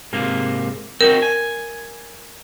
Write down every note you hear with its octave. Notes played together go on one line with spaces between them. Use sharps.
G#2 C3 A#3
C4 D#4 F#4 A#4
G#5